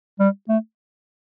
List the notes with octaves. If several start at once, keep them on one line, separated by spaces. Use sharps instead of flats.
G3
A3